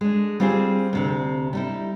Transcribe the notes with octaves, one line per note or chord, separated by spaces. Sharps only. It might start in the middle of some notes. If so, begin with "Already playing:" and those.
G#3 D4
G3 C4 F4 G4 G#4 C5
D2 C3 C4
G3 D#4 E4